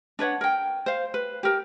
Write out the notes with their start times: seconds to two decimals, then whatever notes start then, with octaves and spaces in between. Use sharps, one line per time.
0.19 D4 B4 C#5 F#5
0.41 A#4 G5
0.86 C5 F5
1.14 B4
1.43 G4 A#4